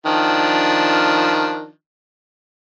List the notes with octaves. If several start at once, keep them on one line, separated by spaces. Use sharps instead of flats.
D#3 F3 D4